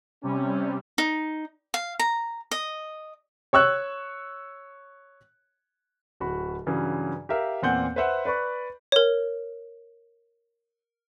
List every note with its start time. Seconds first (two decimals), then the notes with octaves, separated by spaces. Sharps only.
0.23 C3 G3 C#4
0.98 D#4
1.74 F5
1.99 A#5
2.51 D#5
3.53 C#5 C#6 E6 F#6
6.20 D1 F#4 B5
6.66 G2 C#3 E3 F#3
7.29 G4 A#4 E5 F5
7.62 E2 A#2 C4 F#5 G#5 G6
7.96 B4 C5 E5 F#5
8.25 B4 D5 B5 C#6
8.92 A#4 C#5